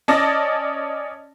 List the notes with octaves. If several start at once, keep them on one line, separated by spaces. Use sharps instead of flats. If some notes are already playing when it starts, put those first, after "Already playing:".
C#4 D5 D#5 A5 A6 A#6